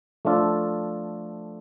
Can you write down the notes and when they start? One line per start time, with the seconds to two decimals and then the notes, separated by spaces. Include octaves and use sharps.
0.25 F3 A3 D4 F4 A4